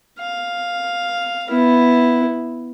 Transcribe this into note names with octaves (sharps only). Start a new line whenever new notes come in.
F5
B3 E4